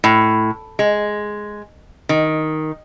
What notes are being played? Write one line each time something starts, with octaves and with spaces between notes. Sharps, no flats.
A2
G#3
D#3